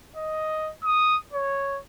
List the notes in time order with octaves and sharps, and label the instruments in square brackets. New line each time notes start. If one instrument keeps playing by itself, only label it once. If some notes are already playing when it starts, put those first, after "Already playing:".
[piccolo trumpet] D#5
D#6
C#5